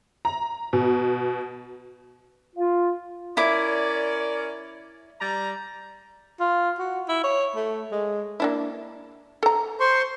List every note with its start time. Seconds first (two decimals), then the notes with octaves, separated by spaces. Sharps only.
0.25 A#5
0.73 B2
2.56 F4
3.37 C#4 E4 A#4 D5 D6
5.20 G3 D5 A#5
6.40 F4
6.79 F#4
7.09 E4
7.24 C#5
7.56 A3
7.92 G#3
8.40 A#3 D4 E4
9.43 A4 A#5
9.80 C5 C6 C#6